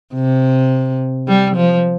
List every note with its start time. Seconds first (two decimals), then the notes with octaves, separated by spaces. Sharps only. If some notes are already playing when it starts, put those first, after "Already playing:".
0.14 C3
1.28 G3
1.56 F3